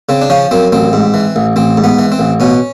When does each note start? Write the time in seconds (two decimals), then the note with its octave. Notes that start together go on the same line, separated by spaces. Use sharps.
0.09 C#3 C4
0.22 D4
0.30 F3 C#4
0.51 F#2 C4
0.72 A1 C4
0.93 G#2
1.14 E3
1.36 A1
1.56 A1 C4
1.77 G#2
1.84 B3
1.99 E3
2.12 C4
2.19 A1
2.40 B2 C#4